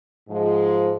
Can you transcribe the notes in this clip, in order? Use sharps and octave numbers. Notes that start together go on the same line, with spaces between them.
G#2 F3 G#3